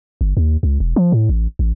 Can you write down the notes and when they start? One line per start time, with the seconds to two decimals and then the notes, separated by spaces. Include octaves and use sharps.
0.21 G1
0.37 D#2
0.63 C#2
0.80 E1
0.96 F3
1.12 A2
1.29 A1
1.59 A1